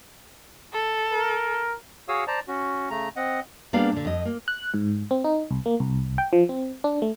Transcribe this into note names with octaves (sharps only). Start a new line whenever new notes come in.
A4
A#4
F#4 G#4 C#5 F5 D#6 E6
C5 D5 A5 A#5
C#4 F#4
C#3 A3 A#5
C4 D#5 F#5
G3 A#3 B3 D4 G#4 F5
A#2 D3
F2 D#5
A#3
F#6
G#2
C4
D#4
C2
A#3
C2
G5
F3
C4
D4
A3